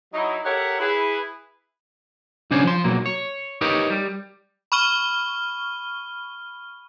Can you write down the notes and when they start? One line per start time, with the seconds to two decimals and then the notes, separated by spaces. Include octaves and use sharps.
0.14 F#3 D#4 E4
0.45 G4 A4 A#4 C#5 E5 F#5
0.80 E4 G#4 B4
2.51 B1 C#3 C#4 D4 C5 C#5
2.64 F3 C6
2.84 B2 F#3 A#3
3.06 C#5
3.61 D#4 G4 A#4 B4 C#5
3.90 G3
4.72 B5 C#6 F6 D#7 G7